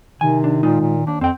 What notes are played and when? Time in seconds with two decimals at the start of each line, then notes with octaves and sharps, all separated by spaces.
0.21 C3 D#3 G#5
0.44 D4
0.63 A#2 G#3 D#4 F4
0.81 A#2
1.07 D#2 D4
1.21 F2 C4 G5